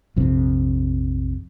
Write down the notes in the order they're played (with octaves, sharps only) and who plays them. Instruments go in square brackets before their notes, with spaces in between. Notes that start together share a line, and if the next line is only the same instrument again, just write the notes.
[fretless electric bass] A#1 F2 C3